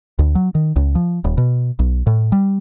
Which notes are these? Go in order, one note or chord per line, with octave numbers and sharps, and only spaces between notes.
D2
F#3
D#3
C#2
F3
D#1
B2
B1
A2
G3